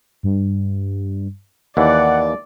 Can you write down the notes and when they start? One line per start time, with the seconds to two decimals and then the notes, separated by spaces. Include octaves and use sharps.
0.23 G2
1.77 D#2 E3 D5 F#5